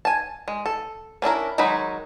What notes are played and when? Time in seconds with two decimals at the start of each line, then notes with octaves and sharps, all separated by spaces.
0.05 G#5 A5
0.48 G#3
0.66 A4
1.22 C#4 D4 E4 A#4
1.58 D#3 F#3 G#3 D#4 B5